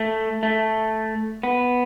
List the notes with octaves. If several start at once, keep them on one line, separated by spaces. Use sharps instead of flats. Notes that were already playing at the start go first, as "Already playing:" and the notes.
Already playing: A3
A3
B3